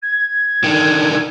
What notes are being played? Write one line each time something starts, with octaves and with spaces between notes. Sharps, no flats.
G#6
D3 D#3